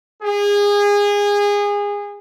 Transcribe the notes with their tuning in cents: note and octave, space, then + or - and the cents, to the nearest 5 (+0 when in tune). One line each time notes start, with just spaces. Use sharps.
G#4 -25